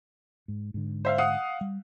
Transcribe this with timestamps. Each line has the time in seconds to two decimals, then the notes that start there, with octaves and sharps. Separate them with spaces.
0.48 G#2
0.74 G#2 D3
1.05 C5 E5 F5
1.18 F5 F#5 D#6
1.61 G3